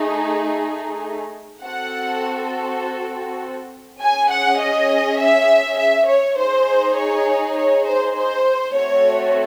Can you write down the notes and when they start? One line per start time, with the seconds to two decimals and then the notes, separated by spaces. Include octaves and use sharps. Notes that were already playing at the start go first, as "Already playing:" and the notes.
Already playing: A3 D#4 G#4
1.64 C4 F#4 A4 F#5
4.01 C#4 G#4 G#5
4.31 F#5
4.60 D#5
5.19 E5
5.79 E5
6.08 C#5
6.38 D#4 G#4 C5
6.97 C#5
7.56 C#5
7.86 C5
8.16 C5
8.74 A3 C4 F#4 A4 C#5